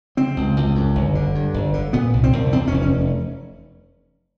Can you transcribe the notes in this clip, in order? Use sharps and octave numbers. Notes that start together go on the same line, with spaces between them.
C#3 C4
C#2
C#2
F#2
G1
D3
G2
G1
D3
A#2 B3
C2
C4
C2
E2 C4
C#4
F1
C#4